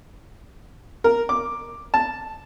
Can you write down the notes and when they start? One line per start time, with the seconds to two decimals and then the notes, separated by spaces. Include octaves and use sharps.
1.04 A#4
1.29 D6
1.94 A5